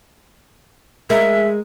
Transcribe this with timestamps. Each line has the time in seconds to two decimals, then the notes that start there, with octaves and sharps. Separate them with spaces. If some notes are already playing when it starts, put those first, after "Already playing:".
1.10 G#3 A#4 E5